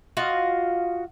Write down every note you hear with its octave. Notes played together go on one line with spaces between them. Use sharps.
F4 F#4 D#5 F5